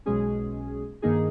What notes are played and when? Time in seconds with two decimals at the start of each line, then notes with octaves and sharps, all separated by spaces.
0.06 B1 B2 G#3 C#4 G#4
1.02 G2 D#3 A#3 D#4 G#4